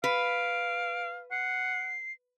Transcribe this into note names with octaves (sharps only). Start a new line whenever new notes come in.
B4 F5 D7
F#5 C7